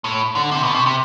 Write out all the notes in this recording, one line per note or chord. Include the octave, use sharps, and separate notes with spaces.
A2
D3
C3
B2
C3
C3